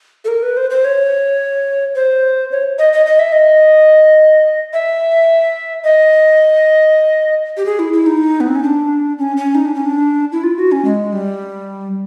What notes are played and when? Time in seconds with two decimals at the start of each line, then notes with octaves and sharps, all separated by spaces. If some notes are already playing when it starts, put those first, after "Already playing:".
0.25 A4
0.28 A#4
0.43 B4
0.57 C5
0.70 C5
0.85 C#5
1.95 C5
2.51 C#5
2.79 D#5
2.93 D#5
3.06 D#5
3.19 E5
3.32 D#5
4.73 E5
5.84 D#5
7.57 G4
7.66 G#4
7.79 E4
7.93 E4
8.06 D#4
8.40 B3
8.48 C4
8.55 C#4
8.63 D4
9.18 C#4
9.37 C#4
9.55 D#4
9.65 D4
9.75 C#4
9.85 D4
10.32 E4
10.43 F4
10.57 F#4
10.72 C#4
10.85 G#3
11.13 G3